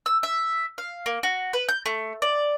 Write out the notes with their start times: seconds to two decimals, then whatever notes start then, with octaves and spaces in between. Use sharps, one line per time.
0.06 E6
0.23 E5
0.78 F5
1.06 A#3
1.23 F#4
1.53 B4
1.69 G6
1.86 A3
2.22 D5